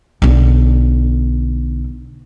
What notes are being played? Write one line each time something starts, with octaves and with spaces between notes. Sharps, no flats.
B1 D3